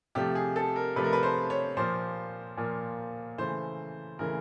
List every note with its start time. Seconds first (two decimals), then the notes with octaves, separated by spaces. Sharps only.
0.15 C3 F3 A3 G4
0.35 G#4
0.56 A4
0.76 A#4
0.96 C3 F3 A3 B4
1.04 A#4
1.13 B4
1.23 C5
1.50 C#5
1.77 A#2 F3 A#3 C5
2.57 A#2 F3 A#3
3.38 C#3 E3 A3 C5
4.19 C#3 E3 A3 A#4